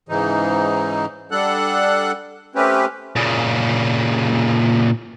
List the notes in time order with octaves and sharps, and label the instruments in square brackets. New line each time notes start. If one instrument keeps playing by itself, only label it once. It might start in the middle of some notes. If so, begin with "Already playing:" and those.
[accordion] G#2 C#3 E3 D#4
G3 D4 A4 F#5 F#6
A3 C4 C#4 G4 B4
[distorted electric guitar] A#2 C#3